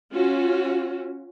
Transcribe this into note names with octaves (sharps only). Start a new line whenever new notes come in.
C#4 F4 F#4